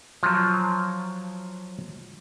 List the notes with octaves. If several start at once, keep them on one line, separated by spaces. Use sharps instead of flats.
F3 F#3